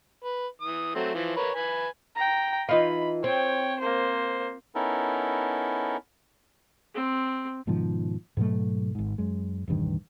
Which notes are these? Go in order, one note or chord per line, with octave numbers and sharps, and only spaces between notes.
B4
E3 D#6
F#3 A3 C4
E3 F3
A#4 B4 C#5
B4 G#5 B5
G5 A#5
E3 D#4 F4 B5
C4 C#5 G5
A#3 C5
B3 C#4 D#4 E4 A4 A#4
C4
G#2 B2 D#3 F3
G#2 B2 F#3 A3
G#1 G#2
F#2 G#3
E1 A1 G2 D#3